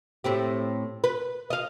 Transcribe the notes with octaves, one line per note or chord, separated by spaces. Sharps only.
A2 C4 G4
B4
D#5 F5